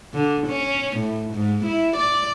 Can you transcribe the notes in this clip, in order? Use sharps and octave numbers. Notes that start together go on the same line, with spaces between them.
D3
C#4
A2
G#2
E4
D5